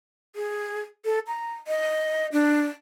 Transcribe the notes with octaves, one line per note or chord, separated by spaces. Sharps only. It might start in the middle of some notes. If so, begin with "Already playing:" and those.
G#4
A4
A#5
D#5
D4